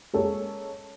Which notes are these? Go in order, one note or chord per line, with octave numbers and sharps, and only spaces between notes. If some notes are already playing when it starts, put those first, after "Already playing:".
G#3 A#3 C#4 A4